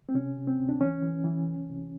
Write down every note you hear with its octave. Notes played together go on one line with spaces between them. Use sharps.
C4
C3 C#4
C3
C4
D2
D4
E3 C#4
E3
E3
C2
C2